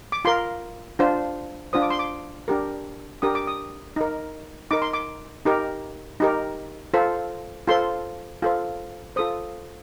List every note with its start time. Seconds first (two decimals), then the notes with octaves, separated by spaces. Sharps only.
0.12 D6
0.25 F4 A#4 C6
0.99 D4 F4 C5
1.73 D4 F4 C5 D#6
1.82 D6
1.90 C6
1.99 D6
2.48 D4 G4 A#4
3.22 D4 G4 A#4 D#6
3.35 D6
3.47 D#6
3.96 D#4 A#4
4.71 D#4 A#4 D6
4.82 C6
4.93 D6
5.45 D#4 G4 A#4
6.20 D#4 G4 A#4
6.94 F4 A4 C5
7.68 F4 A4 C5 C6
8.42 F4 A4 C5
9.16 F4 A4 C5 D#6